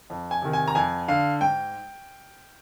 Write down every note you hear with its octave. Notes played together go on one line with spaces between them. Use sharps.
F2
G#5
C3 D#3
G#5
A#5
F2 G#5
D3 F5
G#2 G5